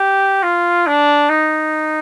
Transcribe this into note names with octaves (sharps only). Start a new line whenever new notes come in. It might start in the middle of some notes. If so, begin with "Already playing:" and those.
Already playing: G4
F4
D4
D#4